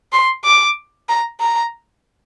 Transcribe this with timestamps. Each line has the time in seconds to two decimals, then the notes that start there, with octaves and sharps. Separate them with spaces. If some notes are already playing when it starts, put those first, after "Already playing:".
0.12 C6
0.44 D6
1.09 A#5
1.40 A#5